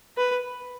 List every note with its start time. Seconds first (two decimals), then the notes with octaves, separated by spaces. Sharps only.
0.17 B4